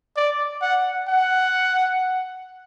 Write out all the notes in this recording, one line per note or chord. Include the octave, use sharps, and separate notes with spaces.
D5
F#5
F#5